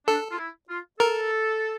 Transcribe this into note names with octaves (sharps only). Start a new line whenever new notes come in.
D4 A4
F4
E4
F4
A4 A#4